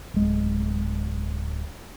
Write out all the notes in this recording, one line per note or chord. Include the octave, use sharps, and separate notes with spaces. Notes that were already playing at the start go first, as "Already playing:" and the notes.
D1 G#3